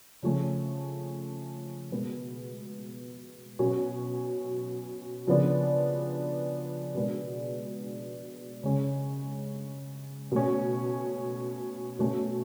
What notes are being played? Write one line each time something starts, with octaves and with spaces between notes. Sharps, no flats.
C#3 F3 A3 C#4
B2 G#3 B3
B2 F#3 C#4
C#3 F3 B3 D4
B2 G#3 B3 D4
C#3 G#3 C#4
B2 A3 C#4
B2 A3 C#4